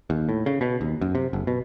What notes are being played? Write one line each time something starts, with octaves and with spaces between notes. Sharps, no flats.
D#2
A2
C#3
B2
D#2
F#2
C3
F#1
B2